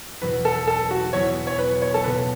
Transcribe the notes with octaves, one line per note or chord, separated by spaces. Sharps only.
E2 B2 F#3 B3 E4 B4
A4
A4
F#4
E2 B2 F#3 B3 E4 C#5
C#5
B4
C#5
A4
C#2 B2 B3 B4